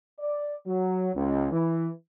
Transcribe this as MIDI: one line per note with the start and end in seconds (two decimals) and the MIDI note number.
0.19 0.54 74
0.67 1.09 54
1.15 1.51 37
1.52 1.89 52